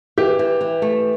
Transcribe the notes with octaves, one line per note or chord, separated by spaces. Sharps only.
E3 G4
E3
E3
A3